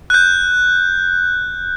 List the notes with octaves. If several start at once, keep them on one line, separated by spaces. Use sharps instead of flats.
F#6 G6